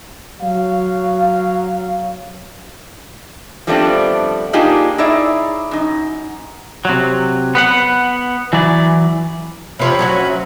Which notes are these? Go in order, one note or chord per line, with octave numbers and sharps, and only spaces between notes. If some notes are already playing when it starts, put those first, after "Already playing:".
F#3 F5
F3 G3 A3 B3 C4 D4
A#3 D4 D#4 F4 G4 G#4
D#4 E4 G#4 C#5 D5 E5
F#2 D#4
C3 F#3
B3 B4 F#5
E3 F#3 E4 D5
C3 F3 C#5 E5 B5
F#3 C#4 F#4